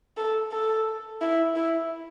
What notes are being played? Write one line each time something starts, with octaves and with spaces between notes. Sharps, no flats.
A4
A4
E4
E4